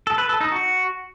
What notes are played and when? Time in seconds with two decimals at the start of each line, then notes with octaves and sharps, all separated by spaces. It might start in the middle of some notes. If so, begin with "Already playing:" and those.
0.07 A4
0.18 B4
0.29 A4
0.41 D#4
0.52 F#4